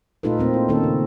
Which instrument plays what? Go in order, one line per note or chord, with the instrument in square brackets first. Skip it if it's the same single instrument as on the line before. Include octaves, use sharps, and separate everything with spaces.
[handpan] A#2 A3 D#4 F4 A4 B4
A3 A#3 C4
E4
D#3 A#3 B3 C#4 D#4 A4
C#3